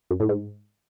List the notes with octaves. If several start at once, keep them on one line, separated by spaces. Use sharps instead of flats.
F#2
A2
G#2